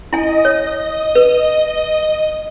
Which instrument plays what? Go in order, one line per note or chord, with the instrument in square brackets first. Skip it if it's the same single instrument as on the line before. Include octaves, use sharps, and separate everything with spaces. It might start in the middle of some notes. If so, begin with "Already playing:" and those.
[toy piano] E4 G#5 [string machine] D#5
[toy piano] C#5
B4